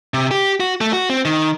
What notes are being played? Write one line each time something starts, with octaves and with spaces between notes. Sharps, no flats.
C3
G4
F#4
A3
F#4
C4
D#3